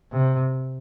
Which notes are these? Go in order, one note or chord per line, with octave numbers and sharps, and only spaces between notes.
C3